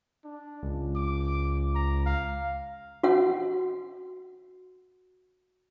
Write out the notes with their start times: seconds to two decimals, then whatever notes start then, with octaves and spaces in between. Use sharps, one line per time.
0.24 D4
0.63 C#2
0.96 D6
1.75 A#5
2.06 F5
3.03 F#4 F#5